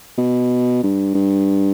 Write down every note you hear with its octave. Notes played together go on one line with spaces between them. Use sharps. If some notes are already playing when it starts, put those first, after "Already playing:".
B2
G2
G2